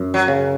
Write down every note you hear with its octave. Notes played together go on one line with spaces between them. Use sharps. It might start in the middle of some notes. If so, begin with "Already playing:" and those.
Already playing: F#2
F#3
C#3